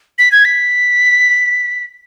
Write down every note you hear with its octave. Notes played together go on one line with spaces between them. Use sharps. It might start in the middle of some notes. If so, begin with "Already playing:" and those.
B6
G#6
B6